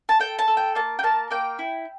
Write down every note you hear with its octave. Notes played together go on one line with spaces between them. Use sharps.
A5
A4 G5
A5
A4
G5
A#3 A5
G5
A#3 A5
A#3 G5
E4